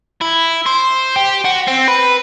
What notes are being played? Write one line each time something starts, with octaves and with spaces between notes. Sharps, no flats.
E4
C5
G4
F#4
C4
B4